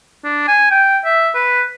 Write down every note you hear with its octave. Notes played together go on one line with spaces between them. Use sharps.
D4
G#5
G5
E5
B4